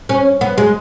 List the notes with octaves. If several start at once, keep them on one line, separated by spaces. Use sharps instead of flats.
C#4
B3
G#3